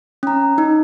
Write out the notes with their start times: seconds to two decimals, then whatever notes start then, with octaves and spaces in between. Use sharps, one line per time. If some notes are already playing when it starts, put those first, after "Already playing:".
0.23 C#4 A#5
0.58 D#4